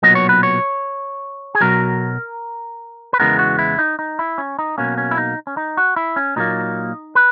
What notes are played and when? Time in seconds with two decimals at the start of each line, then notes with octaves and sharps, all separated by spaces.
0.03 B1 A#2 F#3 B3 D#5
0.15 C#5
0.29 B4
0.43 C#5
1.55 G#4
1.61 B1 B2 F#3 A#4
3.13 B4
3.19 E2 C#3 E3 G#3 B3 A#4
3.39 F#4
3.59 E4
3.78 D#4
3.99 D#4
4.19 E4
4.38 C#4
4.59 D#4
4.78 B1 B2 A#3 C#4
4.98 C#4
5.11 E4
5.18 D#4
5.47 C#4
5.57 D#4
5.77 F#4
5.96 E4
6.16 C#4
6.36 A#2 F#3 A#3 D#4
7.15 B4